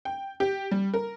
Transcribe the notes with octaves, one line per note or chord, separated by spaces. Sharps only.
G5
G4
G3
A#4